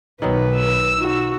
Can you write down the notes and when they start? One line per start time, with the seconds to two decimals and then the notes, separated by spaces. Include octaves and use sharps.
0.22 B1 D#3 F#3 B3 B4
0.56 E6
0.97 D#4 F#4